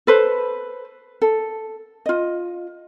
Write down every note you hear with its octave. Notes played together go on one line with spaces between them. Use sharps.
A4 B4 C5
A4
F4 D#5